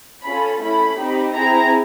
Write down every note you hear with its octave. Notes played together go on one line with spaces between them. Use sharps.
C#4 F4 A4 B5
A3 C#4 E4 B5
C4 D#4 G4
C4 E4 G#4 A#5